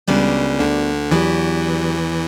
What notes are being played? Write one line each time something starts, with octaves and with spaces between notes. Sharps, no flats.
C#2 C#3 G3 B3 D4 F#4 A#4
D2 D3
E2 E3 F#3 B3 D4 G4